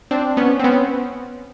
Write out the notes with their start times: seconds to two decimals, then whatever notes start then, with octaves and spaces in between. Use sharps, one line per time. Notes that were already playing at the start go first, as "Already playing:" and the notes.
0.11 C4 D4
0.37 B3 C#4
0.59 C4
0.64 B3 C#4